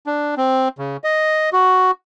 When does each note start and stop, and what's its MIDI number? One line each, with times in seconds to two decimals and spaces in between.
0.06 0.35 62
0.37 0.68 60
0.78 0.97 49
1.04 1.50 75
1.53 1.91 66